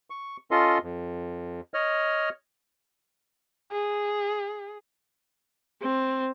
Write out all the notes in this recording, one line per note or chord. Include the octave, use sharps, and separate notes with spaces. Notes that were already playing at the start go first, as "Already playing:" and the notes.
C#6
C#4 F4 A4 D#5 C6
F2
C#5 D#5 F6
G#4
C4